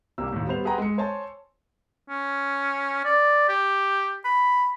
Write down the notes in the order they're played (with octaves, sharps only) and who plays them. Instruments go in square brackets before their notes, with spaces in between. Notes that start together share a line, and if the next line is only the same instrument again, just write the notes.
[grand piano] C2 A#3 G4 E6
D#2 A2
G3 B3 B4 C5 F7
G#4 B4 F#5 G5 A#5 C6
G#3 C#7
C5 C#5 G#5 A5 C6
[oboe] C#4
D5
G4
B5